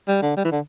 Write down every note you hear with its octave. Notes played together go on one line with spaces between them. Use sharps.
G3
D3
G3
E3
D3